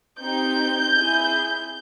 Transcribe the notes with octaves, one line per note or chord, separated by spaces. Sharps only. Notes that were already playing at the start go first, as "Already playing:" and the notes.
C4 D#4 G4 G6
C4 E4 G#4